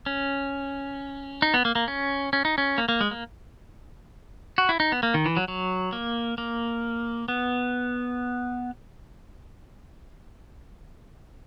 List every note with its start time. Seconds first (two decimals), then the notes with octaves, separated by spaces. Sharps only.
0.06 C#4
1.42 D#4
1.54 B3
1.65 A#3
1.75 A#3
1.88 C#4
2.33 C#4
2.45 D#4
2.58 C#4
2.78 A#3
2.89 A#3
3.01 G#3
3.11 A#3
4.58 F#4
4.69 E4
4.80 D#4
4.92 B3
5.03 A#3
5.14 D#3
5.26 E3
5.37 F#3
5.48 F#3
5.93 A#3
6.38 A#3
7.28 B3